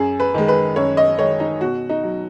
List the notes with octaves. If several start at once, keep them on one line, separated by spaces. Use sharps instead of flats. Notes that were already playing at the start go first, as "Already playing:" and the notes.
Already playing: F#2 G#4
B4
D#3 G#3
B4
F#2 C#5
D#5
D#3 G#3 C#5
D#4
B2 F#4
D#4
F#3